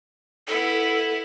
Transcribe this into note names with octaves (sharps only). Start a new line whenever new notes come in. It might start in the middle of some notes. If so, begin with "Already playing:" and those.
B3 E4 A4